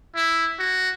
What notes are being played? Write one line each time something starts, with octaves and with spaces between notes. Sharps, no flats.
E4
F#4